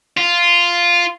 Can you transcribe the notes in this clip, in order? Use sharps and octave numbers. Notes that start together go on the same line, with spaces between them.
F4